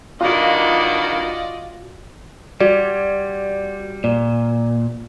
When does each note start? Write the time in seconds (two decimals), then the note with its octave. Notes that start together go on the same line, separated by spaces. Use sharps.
0.21 G2 D#3 A#3 F4 F#4 D5 D#5
2.60 G3 F#4 D5
4.04 A#2 D5